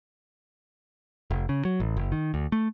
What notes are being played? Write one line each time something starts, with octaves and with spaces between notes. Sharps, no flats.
F1
C#3
F#3
A1
F#1
D#3
D2
A3